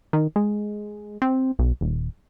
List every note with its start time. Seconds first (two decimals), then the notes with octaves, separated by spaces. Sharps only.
0.13 D#3
0.36 G#3
1.22 C4
1.59 B1
1.81 D#1